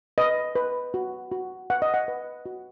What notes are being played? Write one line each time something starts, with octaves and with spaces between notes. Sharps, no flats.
B4 D#5
B4
F#4
F#4
B4 F#5
D#5
F#5
B4
F#4